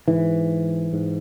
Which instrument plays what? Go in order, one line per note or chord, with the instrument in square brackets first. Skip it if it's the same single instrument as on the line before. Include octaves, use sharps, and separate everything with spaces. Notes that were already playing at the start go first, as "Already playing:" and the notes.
[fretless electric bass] G#2 E3
G#2